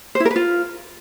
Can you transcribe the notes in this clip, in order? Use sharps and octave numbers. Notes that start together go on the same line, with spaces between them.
C5
E4
A#4
B4
F4